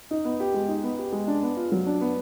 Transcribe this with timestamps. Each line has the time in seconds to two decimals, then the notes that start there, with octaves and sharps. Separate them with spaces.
0.11 D#4
0.25 B3
0.40 G4
0.54 G#3
0.68 D#4
0.83 B3
0.98 G4
1.12 G#3
1.27 D4
1.42 B3
1.56 F4
1.72 F#3
1.86 D4
2.01 B3